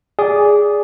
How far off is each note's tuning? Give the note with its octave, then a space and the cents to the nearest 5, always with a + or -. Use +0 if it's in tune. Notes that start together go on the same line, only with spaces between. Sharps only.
G#4 -5 D5 -15